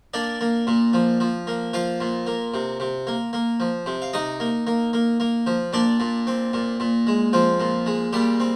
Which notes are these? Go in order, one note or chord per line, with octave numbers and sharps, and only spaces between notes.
A#3 D4 D5
A#3
A#2
F3
F3
A#3
F3 F4 F5
A#2
A#3
C3
C3
A#3
A#3
F3
C3
F5
C3 D#4 D#5
A#3
A#3
A#3
A#3
F3
A#2 D4 D5
A#2
C4
A#2
A#2
G#3
F3 C4 F4
A#2
G#3
A#2 G3 G4
C4